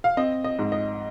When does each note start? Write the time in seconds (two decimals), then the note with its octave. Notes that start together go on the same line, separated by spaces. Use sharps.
0.04 F5
0.17 C4 D#5
0.44 D#5
0.59 G#2
0.72 D#5